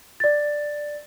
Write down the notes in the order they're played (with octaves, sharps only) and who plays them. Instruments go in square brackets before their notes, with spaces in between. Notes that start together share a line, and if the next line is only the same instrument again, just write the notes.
[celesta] D5 A6